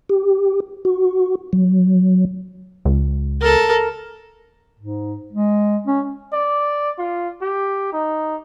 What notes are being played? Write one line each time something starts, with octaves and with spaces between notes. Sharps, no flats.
G4
F#4
F#3
C#2
A4 A#4
G#2
G#3
C#4
D5
F4
G4
D#4